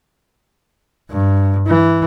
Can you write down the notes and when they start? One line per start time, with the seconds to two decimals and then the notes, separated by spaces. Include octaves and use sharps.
1.10 G2
1.67 E3